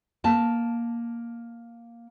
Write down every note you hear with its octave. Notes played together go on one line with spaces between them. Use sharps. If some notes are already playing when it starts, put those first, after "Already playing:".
A#3 A5